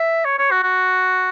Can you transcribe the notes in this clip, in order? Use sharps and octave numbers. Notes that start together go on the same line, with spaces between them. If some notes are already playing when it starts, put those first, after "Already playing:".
Already playing: E5
C#5
C#5
F#4
F#4